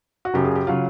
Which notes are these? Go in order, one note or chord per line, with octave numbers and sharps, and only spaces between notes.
F#4
F#2 C#3 F#3 G4
G#4
G4
C#3 F#3 F4